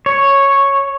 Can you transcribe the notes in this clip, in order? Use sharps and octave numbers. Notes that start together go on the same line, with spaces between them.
C#5